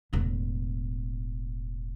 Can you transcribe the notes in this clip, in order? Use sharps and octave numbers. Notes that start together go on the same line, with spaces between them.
E1 A2